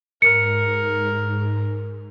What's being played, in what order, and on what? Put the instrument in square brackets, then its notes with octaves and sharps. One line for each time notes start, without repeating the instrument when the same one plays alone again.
[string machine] G#2 [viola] A#4 [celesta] C#7